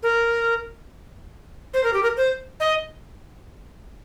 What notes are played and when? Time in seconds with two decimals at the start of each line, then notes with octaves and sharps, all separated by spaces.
0.03 A#4
1.74 C5
1.84 A#4
1.93 G4
2.03 A#4
2.17 C5
2.60 D#5